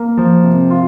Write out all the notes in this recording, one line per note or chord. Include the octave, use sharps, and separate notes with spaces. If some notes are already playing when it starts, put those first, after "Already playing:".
Already playing: A#3
F3
C3
F4